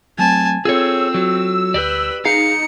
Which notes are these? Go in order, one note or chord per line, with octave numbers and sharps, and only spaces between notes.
F#3 A3 C4 G#5 A5
C4 F4 G#4 A4 C#5 E6
F#3
D2 G4 B4 D5
D#4 G#4 F5 C#7